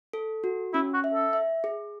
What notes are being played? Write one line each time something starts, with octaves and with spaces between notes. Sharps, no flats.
A4
F#4
C#4 E4
F#4
E5
A4
E5
G#4